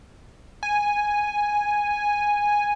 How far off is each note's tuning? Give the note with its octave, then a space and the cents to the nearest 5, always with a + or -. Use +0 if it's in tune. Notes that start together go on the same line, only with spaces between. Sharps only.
G#5 -5